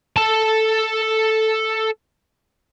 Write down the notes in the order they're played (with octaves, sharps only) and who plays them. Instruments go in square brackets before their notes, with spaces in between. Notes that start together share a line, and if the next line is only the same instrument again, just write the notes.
[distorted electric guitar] A4 A5